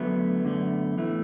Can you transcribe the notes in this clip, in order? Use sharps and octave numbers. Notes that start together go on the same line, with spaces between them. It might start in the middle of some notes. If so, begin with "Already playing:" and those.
Already playing: F#2 D3 F#3 A3 B3
F#2 D3 A3
A2 E3 A3